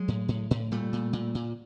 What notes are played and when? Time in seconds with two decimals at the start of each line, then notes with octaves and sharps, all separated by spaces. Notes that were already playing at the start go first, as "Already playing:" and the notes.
Already playing: F#3 G#3
0.08 A2
0.28 A2
0.51 A2
0.71 A#2 G3 A3
0.93 A#2
1.13 A#2
1.35 A#2